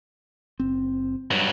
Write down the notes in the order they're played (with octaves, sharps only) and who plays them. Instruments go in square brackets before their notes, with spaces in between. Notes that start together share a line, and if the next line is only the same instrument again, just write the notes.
[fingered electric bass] F#1 C4
[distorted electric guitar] G2 F#3